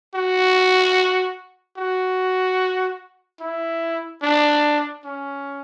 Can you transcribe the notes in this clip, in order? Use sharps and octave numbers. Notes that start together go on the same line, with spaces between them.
F#4
F#4
E4
D4
C#4